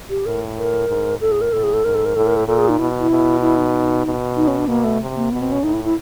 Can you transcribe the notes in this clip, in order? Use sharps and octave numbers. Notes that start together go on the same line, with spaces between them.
G4
A2 A#4
A#4
G#2
A2 A4
G#4
A#4
A2 A4
G#4
A4
G#2 A#4
A4
A#4
A2 A4
A#4
A4
A#2 A4
G#4
D#4
B2 E4
E4
B2
E4
D#4
B2
D#4
C#4
D4
B2 A#3
A3
C3
A#3
B2 B3
C4
C#4
A2 D#4
E4
E4